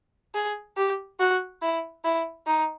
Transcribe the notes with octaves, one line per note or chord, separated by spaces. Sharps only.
G#4
G4
F#4
E4
E4
D#4